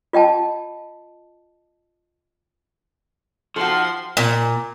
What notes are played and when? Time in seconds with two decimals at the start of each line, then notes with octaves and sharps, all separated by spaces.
0.13 F4 D#5 G5 A5
3.56 F3 D#4 F#4 A4 G5 C6 F6
4.17 A#2